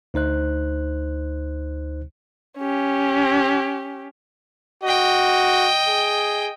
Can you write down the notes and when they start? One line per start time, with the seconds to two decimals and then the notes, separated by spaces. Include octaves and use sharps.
0.14 D2 D#4 C5 F#6
2.58 C#4 G4
4.84 F#4 D#5 G5
5.88 G#4